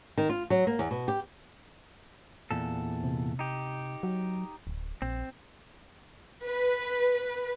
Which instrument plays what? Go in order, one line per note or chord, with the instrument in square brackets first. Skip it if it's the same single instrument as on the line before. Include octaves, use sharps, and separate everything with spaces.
[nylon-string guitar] D#3
F4
F#3
A#3
E2
B2
G4
[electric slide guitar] E2 A#2 A4
[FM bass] C3
[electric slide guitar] D#4 G4
[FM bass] F#3
D1
[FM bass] A#1 [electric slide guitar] C4
[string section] B4